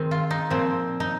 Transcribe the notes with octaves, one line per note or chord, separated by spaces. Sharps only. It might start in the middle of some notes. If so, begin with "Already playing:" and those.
Already playing: D#3 G#3 C4
F4
D#4
A#2 F3 C4
D#4